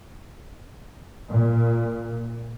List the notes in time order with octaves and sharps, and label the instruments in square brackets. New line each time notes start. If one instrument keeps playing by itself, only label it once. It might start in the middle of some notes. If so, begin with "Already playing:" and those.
[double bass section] A#2